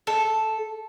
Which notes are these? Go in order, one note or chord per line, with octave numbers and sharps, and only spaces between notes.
A4